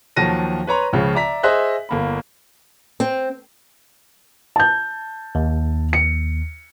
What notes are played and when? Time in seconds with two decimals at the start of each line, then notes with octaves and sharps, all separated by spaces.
0.16 D#2 F3 F#3 A5 A#6 D#7
0.67 B4 C#5 A#5 C6
0.93 C#2 C#3 F3
1.15 D5 E5 A#5 B6
1.43 G#4 C5 D#5 E5 F#6
1.89 G1 A#3 B5
3.00 C4
4.56 A5 G6
5.35 D#2
5.93 C#7